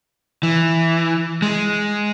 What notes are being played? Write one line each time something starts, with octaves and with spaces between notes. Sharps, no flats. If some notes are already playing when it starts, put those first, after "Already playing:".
E3
G#3